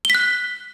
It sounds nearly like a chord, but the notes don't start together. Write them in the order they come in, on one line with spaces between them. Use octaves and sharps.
G7 B6 F#6